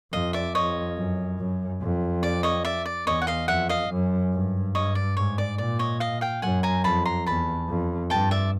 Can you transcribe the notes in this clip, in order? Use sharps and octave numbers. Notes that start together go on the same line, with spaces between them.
F2 D#5 F5
D5 E5
F2 C#5 D#5
F#2
F#2
F2
D5
C#5 D#5
D5 E5
D5
E2 C#5 D#5
F#5
D#5 F5
F2 E5 F#5
D#5 F5
F#2
G2
G2 C#5 D#5
D5
G#2 C#5
D5
A#2 D5
C#5 D#5
D#5 F5
F5 G5
F#2 F#5 G#5
G#5 A#5
F2 A5 B5
A#5 C6
E2 A5 B5
F2
G2 G5 A5
D5 E5